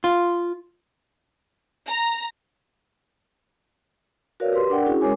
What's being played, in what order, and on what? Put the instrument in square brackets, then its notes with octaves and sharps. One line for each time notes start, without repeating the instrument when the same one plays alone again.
[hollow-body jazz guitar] F4
[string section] A#5
[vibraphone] F#4 A#4 B4 C#5 D5 F5
G4 B4 C6
D4 A#4 D5 F#5 G5
C#4 E4 F#4 G#4
G#3 C#4 A#4 C#5 G#5 D6